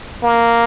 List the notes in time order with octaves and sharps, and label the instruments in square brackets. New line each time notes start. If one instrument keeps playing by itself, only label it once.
[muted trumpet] A#3